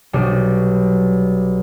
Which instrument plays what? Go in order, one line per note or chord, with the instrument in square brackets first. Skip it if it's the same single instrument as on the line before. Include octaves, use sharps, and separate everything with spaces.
[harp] B1 G3